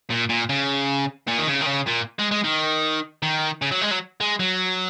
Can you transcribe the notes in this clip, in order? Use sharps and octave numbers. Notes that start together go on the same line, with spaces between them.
A#2
A#2
C#3
A#2
D#3
C#3
D#3
C#3
A#2
G#3
G#3
D#3
D#3
C#3
F#3
G#3
F#3
G#3
F#3